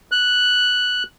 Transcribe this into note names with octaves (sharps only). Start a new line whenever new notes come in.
F#6